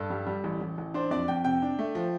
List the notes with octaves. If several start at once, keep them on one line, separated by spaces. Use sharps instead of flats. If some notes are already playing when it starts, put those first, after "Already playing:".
Already playing: G2 A4
G3
G3
A1
A1
A1
D4 C5
F2 D5
F2 G5
C3 G5
D4
A3
F3